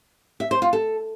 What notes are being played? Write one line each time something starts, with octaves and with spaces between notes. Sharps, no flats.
E5
C5
F4
A4